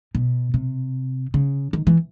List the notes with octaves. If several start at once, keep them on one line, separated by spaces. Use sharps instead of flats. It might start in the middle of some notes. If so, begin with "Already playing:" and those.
B2
C3
C#3
D#3
E3